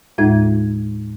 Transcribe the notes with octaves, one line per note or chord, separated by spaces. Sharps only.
D#2 A2 G#3 D#4 F4 G#6